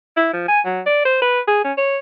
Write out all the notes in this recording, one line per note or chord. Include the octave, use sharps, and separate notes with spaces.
E4
F3
G#5
F#3
D5
C5
B4
G#4
C#4
C#5